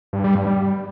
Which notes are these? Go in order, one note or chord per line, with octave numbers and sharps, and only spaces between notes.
G2
G3
G2
G3